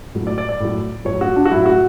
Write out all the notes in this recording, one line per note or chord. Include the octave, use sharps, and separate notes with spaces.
A2 F#3
D5
D5
D5
A2 F#3
A2 F#3 C#5
F#4
D4
F#4
A2 F#3 E4
F#4